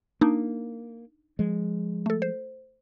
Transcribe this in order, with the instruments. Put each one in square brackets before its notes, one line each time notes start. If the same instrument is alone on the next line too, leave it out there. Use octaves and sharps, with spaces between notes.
[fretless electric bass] A#3 [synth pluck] D4 D#4
[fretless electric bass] F3 G#3
[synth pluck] A3 A4
C5